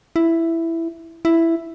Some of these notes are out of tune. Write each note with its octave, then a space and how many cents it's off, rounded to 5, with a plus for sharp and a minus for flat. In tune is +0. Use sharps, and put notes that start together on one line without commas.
E4 +5
E4 +5